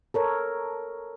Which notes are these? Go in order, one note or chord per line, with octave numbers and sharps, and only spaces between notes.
A4 A#4 C#5